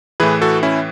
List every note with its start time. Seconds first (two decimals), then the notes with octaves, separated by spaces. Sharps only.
0.20 A2 E3 G#4 B4
0.42 F#4 A4
0.63 C#4 E4